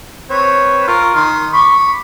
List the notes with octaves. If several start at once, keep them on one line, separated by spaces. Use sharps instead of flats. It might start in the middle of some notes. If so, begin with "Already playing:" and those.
C4 B4 C#5
F4 A#4 C#6
D#3 C6
B5 C#6 D6